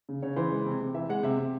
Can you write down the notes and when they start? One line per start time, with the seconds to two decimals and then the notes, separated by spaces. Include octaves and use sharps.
0.09 C#3
0.22 C#3 C#5
0.36 E3 C5
0.52 G#3
0.66 C3
0.81 C3
0.94 E3 E5
1.09 G#3 F#5
1.23 C3 E5
1.38 C3